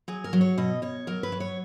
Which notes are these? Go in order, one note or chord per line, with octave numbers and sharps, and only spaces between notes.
F#3 G#4
A#4
F#3
C#5
B2 D#5
B2 C#5
F#3 A#4
B4
F#3
C#5